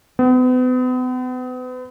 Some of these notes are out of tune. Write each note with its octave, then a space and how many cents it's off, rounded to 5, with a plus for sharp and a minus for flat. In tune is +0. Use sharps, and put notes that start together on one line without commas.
B3 +40